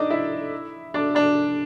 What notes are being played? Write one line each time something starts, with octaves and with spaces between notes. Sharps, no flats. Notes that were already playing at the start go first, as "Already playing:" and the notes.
Already playing: D4 D#4 D5 D#5
E4 E5
D4 D5
D4 D5